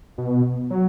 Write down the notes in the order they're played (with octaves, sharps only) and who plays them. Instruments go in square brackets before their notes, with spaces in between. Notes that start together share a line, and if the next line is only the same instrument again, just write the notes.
[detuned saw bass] B2
F#3